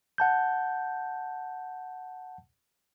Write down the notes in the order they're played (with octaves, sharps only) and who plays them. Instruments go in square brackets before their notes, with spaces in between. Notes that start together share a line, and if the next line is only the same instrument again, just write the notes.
[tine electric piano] F#5 A5 G6